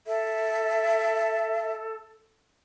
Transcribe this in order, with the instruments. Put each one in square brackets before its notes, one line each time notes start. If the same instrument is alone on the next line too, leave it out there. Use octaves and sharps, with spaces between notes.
[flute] A4 [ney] E5